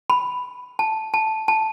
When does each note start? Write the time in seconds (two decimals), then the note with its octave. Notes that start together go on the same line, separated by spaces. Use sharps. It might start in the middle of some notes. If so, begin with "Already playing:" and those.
0.10 B5
0.79 A5
1.14 A5
1.48 A5